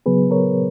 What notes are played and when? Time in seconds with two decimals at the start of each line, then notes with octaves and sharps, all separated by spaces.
0.06 C#3 F#3 B3 G#4 B4
0.31 A#4 C#5